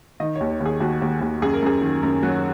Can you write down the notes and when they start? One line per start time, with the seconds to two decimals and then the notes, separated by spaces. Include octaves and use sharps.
0.20 D#3 D#5
0.36 C#5
0.41 D#2
0.51 C#5
0.60 D#2
0.66 G#4
0.80 D#2 F#4
1.02 D#2
1.21 D#2
1.42 F#2 G#4
1.53 A#4
1.63 F#2 G#4
1.82 D#3
2.03 F#2 A#4
2.23 F#3 F#4